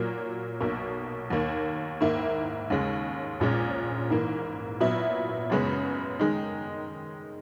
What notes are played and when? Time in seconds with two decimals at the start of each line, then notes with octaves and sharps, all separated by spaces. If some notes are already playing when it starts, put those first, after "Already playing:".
Already playing: A#2 F#3 A#3
0.60 B1 B2 A#3
1.30 D#2 D#3 A#3
2.01 G#2 D#3 A#3 E4
2.70 D#2 C#3 G#3
3.40 A#1 A#2 G#3 C#4
4.10 G#2 E3 A#3
4.80 A#2 F#3 B3 E4
5.50 F#2 C#3 G#3 B3
6.19 D#3 G#3 D#4